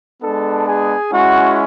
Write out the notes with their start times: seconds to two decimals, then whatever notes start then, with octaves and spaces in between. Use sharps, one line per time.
0.22 G#3 B3 D4 A4 A5
0.67 G#4 G#5
1.12 G#3 C#4 E4 F#4 F#5